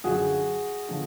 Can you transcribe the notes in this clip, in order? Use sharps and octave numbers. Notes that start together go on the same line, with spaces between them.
F#2 D3 F3 F#4 G#4
D3 F3